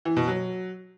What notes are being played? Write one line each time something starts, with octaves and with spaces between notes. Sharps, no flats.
E3
B2
F#3